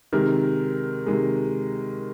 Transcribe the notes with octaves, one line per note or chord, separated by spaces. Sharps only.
C3 D#3 G#3 A#4
C3 D#3 G#3